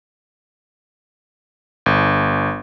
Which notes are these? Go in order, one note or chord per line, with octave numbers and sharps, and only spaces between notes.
G1